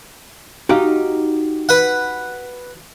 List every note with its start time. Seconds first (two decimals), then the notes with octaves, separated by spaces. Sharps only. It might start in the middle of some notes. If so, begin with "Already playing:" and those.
0.69 D#4 F#4 G4 F5
1.69 B4 F#5